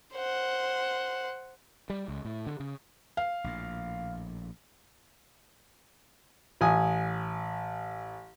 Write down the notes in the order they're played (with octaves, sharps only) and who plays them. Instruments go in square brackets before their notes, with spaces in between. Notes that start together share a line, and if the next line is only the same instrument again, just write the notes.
[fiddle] C5 F#5
[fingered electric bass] G3
C#2
A2
D3
C#3
[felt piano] F5
[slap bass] A#1 A2
[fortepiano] A1 G#5 D#6